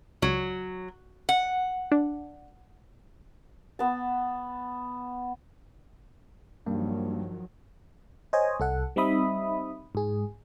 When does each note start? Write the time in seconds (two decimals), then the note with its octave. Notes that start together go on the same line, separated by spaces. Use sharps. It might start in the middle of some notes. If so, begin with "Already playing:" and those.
0.22 C#2 F#3
1.29 F#5
1.92 D4
3.79 B3 A5
6.66 G2 D#3 F3 F#3 A#3
8.33 C5 C#5 D#5 G#5
8.60 C2 A4 F#5
8.96 G3 C4 D#4 E5 B5 D#6
9.95 G#2 G#4